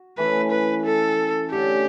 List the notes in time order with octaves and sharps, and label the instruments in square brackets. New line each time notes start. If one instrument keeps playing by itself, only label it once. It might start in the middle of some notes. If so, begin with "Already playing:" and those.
Already playing: [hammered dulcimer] F#4
[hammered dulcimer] E3 A3 C#4 [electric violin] B4
[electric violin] B4
A4
[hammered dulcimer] D3 A3 C#4 [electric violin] G4